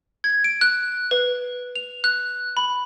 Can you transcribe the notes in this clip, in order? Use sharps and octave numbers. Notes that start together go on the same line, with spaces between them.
G#6
D7
F#6
B4
F7
F#6
B5